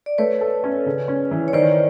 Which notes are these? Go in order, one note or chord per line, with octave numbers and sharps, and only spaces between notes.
D5
A3 B4 C#5
A4
C#4
C#3
C#4
E3
C#5
D#3 C5 D5